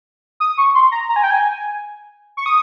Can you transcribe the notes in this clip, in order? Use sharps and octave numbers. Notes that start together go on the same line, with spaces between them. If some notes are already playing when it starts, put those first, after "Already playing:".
D#6
C#6
C6
A#5
A#5
G#5
G5
G#5
C#6
D#6